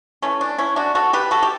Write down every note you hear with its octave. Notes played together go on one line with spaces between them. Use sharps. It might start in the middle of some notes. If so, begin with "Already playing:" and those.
E3 A3 C#4
D4
C#4 E4
D4 F#4
F#4 A4
G4 B4
F#4 A4
G4